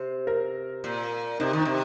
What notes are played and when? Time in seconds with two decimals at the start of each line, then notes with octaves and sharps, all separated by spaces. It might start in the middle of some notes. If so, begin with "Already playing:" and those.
Already playing: C3 C5
0.27 A#4
0.84 A#2
1.40 C3 D#4
1.53 D#3
1.59 D#4
1.65 C3